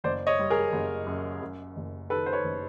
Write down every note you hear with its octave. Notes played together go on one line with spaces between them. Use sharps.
F#1 C5 D5
C#5 D#5
G3
G#4 A#4
F#1
F#2
F#2
F#1
D#3 A4 B4
C5
B4 C#5
F#1